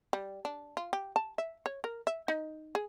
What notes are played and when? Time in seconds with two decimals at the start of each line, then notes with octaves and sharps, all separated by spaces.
0.13 G3
0.45 D4
0.77 F4
0.93 G4
1.16 A5
1.38 E5
1.66 C#5
1.84 A#4
2.07 E5
2.28 D#4
2.75 G#4